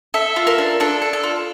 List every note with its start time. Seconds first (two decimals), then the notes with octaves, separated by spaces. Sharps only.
0.14 A4 E5
0.36 F4
0.47 A#4
0.58 D4
0.80 D4 A4
1.02 A4
1.13 A4
1.23 F4